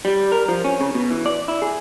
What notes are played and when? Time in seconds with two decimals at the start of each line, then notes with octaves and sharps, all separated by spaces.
0.05 G3
0.32 A#4
0.49 F3
0.64 C#4
0.81 C#3
0.95 B2
1.11 E3
1.26 D5
1.48 E4
1.62 G#4